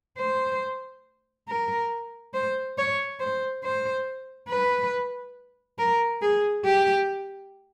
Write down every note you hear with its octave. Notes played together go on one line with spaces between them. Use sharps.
C5
A#4
C5
C#5
C5
C5
B4
A#4
G#4
G4